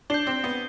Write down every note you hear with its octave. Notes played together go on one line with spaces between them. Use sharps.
D4 G6 C7 G7
C4
B3